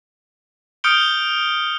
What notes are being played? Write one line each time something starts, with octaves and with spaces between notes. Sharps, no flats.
D#6 F6 G6 C#7 D7 G7